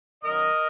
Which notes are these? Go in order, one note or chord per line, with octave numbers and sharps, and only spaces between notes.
F#2 D#3 F#3 A#4 D#5